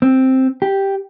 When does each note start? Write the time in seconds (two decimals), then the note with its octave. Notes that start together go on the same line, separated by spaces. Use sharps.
0.02 C4
0.62 G4